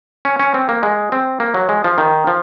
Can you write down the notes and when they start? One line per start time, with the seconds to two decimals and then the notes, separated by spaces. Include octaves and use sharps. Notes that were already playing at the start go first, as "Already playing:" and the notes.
0.25 C#4
0.39 C#4
0.54 C4
0.69 A#3
0.83 G#3
1.12 C4
1.40 A#3
1.54 F#3
1.69 G#3
1.84 F3
1.98 D#3
2.27 F3